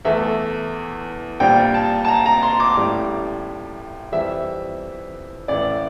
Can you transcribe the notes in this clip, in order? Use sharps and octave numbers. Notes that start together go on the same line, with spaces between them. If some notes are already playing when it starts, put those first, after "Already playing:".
E2 E3 A3 E5
A#1 A#2 G3 G5
A5
A5
A#5
A#5
C6
D6
A1 A2 G3
F2 E3 G3 E5
A1 A2 E3 D5